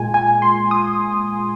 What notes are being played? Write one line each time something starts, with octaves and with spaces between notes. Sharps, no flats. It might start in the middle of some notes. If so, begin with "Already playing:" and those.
Already playing: A#2 G#3 F4 G#5
G#5
C6
D#6